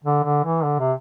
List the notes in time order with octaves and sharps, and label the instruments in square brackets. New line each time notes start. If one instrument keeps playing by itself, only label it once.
[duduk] D3
D3
E3
D3
C3